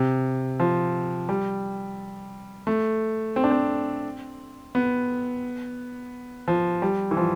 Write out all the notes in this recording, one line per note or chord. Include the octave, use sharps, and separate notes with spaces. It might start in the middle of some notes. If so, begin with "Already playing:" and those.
Already playing: C3
F3
G3
A3
C4
D4
C4
B3
F3
G3
E3
F3